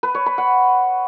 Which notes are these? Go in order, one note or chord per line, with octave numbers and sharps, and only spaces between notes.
B4
C#5
B5
F#5